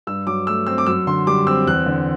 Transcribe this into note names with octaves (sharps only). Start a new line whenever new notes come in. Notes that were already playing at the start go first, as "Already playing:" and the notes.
G2 E6
F#3 D6
A3 E6
C4 E6
D6
F#2 E6
D3 C6
G3 D6
C4 E6
E2 F#6
D3